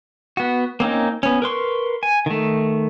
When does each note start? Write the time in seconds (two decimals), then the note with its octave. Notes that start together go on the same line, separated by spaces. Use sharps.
0.37 B3 F#4
0.80 A#3 C4 C#4 D#4
1.23 B3 C#4
1.42 A#4 B4 C6 C#6
2.03 G#5
2.26 D#3 A3